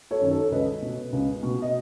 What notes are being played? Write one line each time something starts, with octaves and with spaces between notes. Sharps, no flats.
A4 C#5
F#2 D#3
A4 C#5
C#2 B4 D#5
B2
C#2
B2
D#5